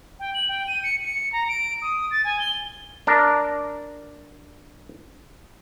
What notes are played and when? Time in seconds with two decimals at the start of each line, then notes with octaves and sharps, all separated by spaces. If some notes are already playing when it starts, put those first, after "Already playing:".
0.20 G5
0.34 F#7
0.49 G5
0.68 D#7
0.84 C#7
1.04 C#7
1.32 A#5
1.48 D7
1.82 D#6
2.11 A6
2.24 G#5
2.39 G7
3.07 D4 A#4